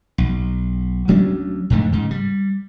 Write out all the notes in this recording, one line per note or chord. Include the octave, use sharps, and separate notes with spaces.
B1
D2 F#3 C#4 D4
F2 G#2 D3 A3
G#2 C#3
G3